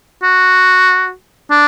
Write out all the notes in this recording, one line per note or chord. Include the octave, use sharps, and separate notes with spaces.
F#4
D4